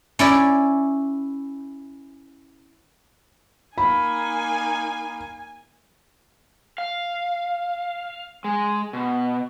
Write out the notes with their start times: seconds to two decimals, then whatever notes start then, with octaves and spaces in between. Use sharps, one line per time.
0.19 C#4 E4 D5
3.78 A#3 D#4 G#5 B5
6.78 F5
8.44 G#3
8.93 B2